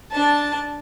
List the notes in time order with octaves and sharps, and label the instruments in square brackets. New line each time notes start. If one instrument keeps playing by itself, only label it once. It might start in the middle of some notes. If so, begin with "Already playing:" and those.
[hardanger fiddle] D4 A5